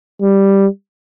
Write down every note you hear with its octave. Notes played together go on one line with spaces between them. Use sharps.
G3